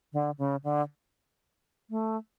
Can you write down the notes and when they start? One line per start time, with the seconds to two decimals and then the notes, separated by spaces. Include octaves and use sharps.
0.13 D3
0.38 C#3
0.64 D3
1.90 A3